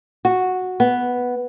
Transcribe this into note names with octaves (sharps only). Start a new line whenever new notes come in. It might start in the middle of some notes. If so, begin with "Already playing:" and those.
F#4
B3